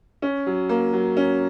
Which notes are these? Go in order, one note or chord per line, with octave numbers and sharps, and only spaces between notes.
C#4
F#3
A#3
F#3
C#4